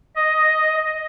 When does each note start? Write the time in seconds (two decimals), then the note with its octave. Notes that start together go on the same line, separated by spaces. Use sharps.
0.16 D#5